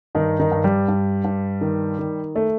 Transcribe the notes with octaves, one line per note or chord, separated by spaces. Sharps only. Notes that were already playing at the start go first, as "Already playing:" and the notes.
G2 D#3 D#4
D#3 D#4
G2
G3
G2
G2
D#3
D#3
A3